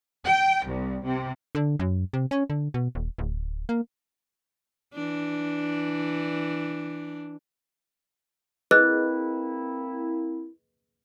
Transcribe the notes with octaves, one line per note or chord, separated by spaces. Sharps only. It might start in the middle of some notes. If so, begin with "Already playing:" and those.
G5
C2
C3
D3
F#2
C3
C#4
D3
B2
D#1
D1
A#3
E3 D4
A#3 C4 E4 G#4 B4 D#5 F#6